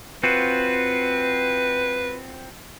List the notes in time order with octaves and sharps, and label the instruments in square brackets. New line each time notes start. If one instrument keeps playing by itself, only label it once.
[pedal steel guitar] C4 F4 F#4 [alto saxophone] B4